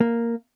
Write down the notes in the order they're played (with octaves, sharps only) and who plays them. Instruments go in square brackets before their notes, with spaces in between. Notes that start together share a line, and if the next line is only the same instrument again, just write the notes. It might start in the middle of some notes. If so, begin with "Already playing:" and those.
[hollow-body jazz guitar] A#3